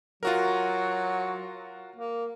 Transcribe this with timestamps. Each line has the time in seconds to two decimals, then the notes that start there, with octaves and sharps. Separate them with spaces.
0.23 F#3 F4 F#4 A#4
1.96 A#3